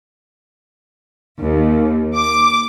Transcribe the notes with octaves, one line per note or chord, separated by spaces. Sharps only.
D#2
D6